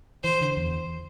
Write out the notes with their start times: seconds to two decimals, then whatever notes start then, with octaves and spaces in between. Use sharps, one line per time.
0.23 E3 C5
0.41 D3
0.57 E2